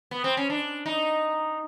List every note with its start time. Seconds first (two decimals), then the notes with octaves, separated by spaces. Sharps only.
0.11 B3
0.24 C4
0.37 C#4
0.50 D4
0.86 D#4